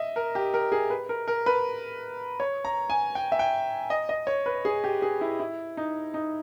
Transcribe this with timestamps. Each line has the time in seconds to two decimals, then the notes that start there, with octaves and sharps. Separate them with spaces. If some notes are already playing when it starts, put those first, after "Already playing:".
Already playing: D#5 E5
0.16 A#4
0.35 G4
0.54 A#4
0.72 G#4
0.90 B4
1.09 A#4
1.28 A#4
1.46 B4
2.40 C#5
2.65 A#5
2.90 G#5
3.15 G5
3.32 E5
3.39 G5
3.90 D#5
4.09 D#5
4.27 C#5
4.46 B4
4.65 G#4
4.84 G4
5.02 G#4
5.21 E4
5.40 E4
5.77 D#4
6.14 D#4